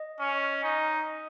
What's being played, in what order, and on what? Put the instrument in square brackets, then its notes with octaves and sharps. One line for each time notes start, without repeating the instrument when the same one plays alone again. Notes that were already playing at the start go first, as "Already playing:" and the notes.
Already playing: [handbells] D#5
[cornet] C#4
D#4